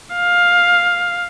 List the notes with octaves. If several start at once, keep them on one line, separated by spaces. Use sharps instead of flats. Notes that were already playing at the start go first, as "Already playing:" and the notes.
F5